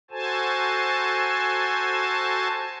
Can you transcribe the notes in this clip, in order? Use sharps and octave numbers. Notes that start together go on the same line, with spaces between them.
F#4 A4 C5 G#5 A5